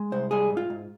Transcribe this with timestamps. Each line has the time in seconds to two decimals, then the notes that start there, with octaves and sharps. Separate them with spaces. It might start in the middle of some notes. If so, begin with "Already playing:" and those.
Already playing: G#3
0.12 C2 C5
0.31 G3 G#4
0.50 G#2
0.57 F4
0.70 G#2